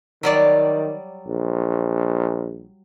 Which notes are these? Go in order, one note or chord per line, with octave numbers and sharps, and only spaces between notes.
D#3 F#3 G3 D5
A#1